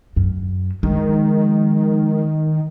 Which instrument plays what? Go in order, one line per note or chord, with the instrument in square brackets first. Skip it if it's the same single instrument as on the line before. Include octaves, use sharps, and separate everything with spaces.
[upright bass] F#2
[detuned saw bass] D#3 [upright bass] F3 G#3